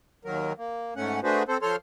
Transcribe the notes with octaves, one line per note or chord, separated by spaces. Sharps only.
D#2 D#3 F#3 A#4
A#3
G#2 A3 C#4 F#5
A3 D4 F#4 G#4 B4 C5
C4 A4 C5
F3 A4 C5 C#5 C6 F6